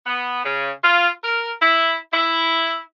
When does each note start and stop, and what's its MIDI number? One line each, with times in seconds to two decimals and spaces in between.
0.06 0.44 59
0.44 0.71 49
0.84 1.09 65
1.24 1.51 70
1.61 1.95 64
2.13 2.79 64